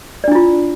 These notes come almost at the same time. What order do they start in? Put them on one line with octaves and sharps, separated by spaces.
D5 D4 E4 F4